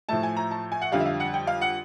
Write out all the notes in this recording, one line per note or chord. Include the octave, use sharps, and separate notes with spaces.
A2 F3 A3 A5
G#5
A#5
A5
G#5
F#5
F2 D3 G3 F5
E5
F5
F#5
G5
F5
F#5